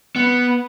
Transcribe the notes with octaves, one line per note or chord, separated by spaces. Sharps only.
B3